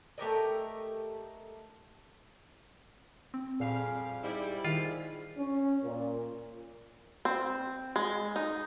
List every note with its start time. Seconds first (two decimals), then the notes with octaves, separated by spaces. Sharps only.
0.18 A3 G4 A#4 D#5
3.34 C4
3.60 F2 A#2 G3 G#4 F5
4.24 G#2 G3 E4
4.65 G#2 D#3 F4
5.37 C#4
5.83 A#2
7.25 C4
7.96 G#3
8.36 D#4